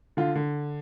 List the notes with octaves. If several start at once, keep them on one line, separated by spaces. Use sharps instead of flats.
D3 F4
D3